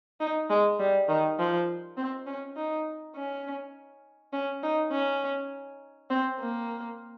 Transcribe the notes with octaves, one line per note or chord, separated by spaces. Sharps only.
D#4
G#3
G3
D#3
F3
C4
C#4
D#4
C#4
C#4
D#4
C#4
C4
A#3